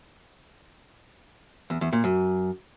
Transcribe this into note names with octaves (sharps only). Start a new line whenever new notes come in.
E2
E2
A#2
F#2